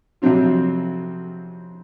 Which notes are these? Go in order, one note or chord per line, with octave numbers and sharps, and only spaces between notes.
F2 C3 F#3 C4 F4